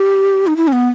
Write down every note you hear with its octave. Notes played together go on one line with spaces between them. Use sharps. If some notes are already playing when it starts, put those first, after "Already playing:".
Already playing: G4
D#4
E4
C#4
B3